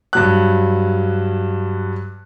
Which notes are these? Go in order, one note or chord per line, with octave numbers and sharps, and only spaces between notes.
G2 F#3 F#6